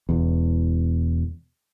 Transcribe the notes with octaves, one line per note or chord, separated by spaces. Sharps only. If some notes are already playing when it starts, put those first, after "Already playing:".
E1 E2